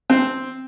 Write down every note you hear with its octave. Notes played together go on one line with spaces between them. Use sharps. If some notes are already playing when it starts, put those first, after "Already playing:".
C4